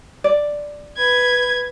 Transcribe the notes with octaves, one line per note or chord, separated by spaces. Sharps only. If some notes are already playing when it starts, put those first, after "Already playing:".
D5
B4 G#6